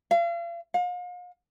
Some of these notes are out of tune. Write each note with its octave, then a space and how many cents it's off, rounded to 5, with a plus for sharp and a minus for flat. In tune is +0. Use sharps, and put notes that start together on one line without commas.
F5 -40
F5 +40